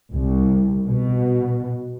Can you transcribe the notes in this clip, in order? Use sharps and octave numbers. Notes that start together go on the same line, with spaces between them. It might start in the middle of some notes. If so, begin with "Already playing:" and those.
C2
B2